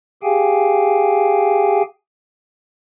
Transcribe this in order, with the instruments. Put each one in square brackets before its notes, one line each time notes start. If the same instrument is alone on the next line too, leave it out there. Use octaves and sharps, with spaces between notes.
[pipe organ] G4 G#4 F5 G5 G#5